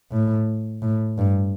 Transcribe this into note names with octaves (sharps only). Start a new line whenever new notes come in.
A2
A2
G2